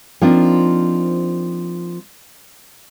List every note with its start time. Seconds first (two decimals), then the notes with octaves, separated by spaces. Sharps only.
0.21 F3 A#3 C4 D4 D#4 F4